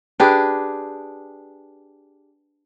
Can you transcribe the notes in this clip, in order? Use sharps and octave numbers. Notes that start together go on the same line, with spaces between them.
D4 G4 G#4 B4